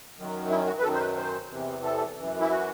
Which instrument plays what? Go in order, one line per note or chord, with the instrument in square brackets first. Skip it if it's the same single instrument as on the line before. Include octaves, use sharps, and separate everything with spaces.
[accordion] F#2 D#3 F#3
E4
F#4
B4
F#2 D#3 F#3 A4
C5
B4
C5
E2 C3 E3
A4
F#2 E3
E4
F#4